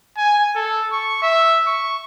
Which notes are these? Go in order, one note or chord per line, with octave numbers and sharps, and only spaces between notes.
G#5
A4
C#6
E5
C#6